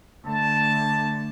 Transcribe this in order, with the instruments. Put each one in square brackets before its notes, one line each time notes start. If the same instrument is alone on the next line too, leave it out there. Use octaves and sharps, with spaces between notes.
[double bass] D3 A3 [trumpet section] A5